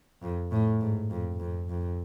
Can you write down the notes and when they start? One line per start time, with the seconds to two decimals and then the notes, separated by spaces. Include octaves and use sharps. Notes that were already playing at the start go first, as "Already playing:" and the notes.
0.23 F2
0.52 A2
0.81 G#2
1.11 F2
1.40 F2
1.69 F2